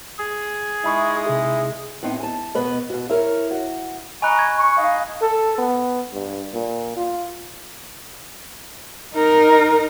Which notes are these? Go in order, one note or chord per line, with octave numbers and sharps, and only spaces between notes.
G#4
G#3 D#4 E4 E5 B5 C#6
C3 G#4
A2 B3 C4 D#4
G#5 A5
B2 B3 B4 D#5
B2 F#4
E4 A#4 B4 C#5
F#4
D#5 G#5 A#5 B5 C#6 F#6
G#6
C#6
D#4 D#5 F5
A4
B3
G2
A#2
F4
D#4 A#4